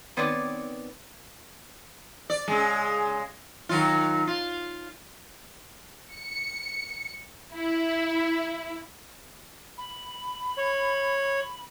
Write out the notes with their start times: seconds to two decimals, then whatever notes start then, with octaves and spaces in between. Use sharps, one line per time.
0.17 D#3 B3 C4 B4 C#5 D5
2.30 D5
2.48 C#3 G#3
3.69 D#3 F#3 F4
4.27 F4
6.12 C#7
7.53 E4
9.78 B5
10.58 C#5